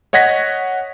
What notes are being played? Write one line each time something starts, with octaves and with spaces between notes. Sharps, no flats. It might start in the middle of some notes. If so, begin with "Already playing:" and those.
C#5 D#5 F#5 G#6 A#6 B6